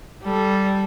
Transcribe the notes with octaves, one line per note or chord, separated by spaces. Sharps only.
G3 A4